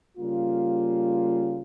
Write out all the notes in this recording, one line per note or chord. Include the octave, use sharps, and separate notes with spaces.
C#3 G3 A#3 F4